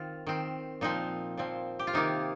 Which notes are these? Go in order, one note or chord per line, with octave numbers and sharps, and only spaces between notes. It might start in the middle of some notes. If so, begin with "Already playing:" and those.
Already playing: D#3 C4 F4
D#3 C4
A#2 F3 C4 D#4
A#2 F3 C4
G4
F4
C3 D#3 A#3 D#4